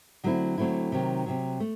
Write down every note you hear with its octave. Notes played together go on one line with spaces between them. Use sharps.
D3 F#3 A3 C4 E4
D3 F#3 A3 C4 E4
C3 D#3 F#3
C3 D#3 F#3
A3